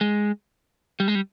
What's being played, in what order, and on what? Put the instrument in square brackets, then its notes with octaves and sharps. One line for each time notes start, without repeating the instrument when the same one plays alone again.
[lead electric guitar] G#3
G3
G#3
G3